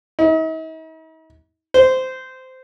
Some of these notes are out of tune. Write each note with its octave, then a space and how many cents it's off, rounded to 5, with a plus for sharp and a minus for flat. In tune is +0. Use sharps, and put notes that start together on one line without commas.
D#4 +45
C5 -15